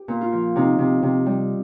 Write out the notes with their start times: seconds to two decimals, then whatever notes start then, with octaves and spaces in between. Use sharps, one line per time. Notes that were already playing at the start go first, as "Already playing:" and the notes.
Already playing: G4
0.08 A#2
0.21 F4
0.33 F3
0.56 C3 D#4
0.79 C3
1.03 C3
1.26 G3